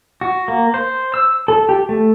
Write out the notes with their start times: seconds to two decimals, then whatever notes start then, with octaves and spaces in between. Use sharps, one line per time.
0.21 F#4
0.48 A#3
0.74 C5
1.14 E6
1.48 A4
1.69 G4
1.89 A3